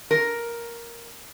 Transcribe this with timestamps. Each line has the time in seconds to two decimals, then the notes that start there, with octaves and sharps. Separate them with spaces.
0.11 A#4